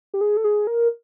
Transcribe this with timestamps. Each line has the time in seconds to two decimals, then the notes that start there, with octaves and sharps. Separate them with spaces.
0.14 G4
0.21 G#4
0.37 A4
0.44 G#4
0.67 A#4